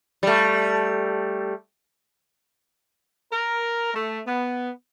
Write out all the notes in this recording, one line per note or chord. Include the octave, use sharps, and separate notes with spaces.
G3 A3
A#4
A3
B3